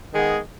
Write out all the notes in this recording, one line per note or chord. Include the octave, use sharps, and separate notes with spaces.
D#3 G#3 B3 G#4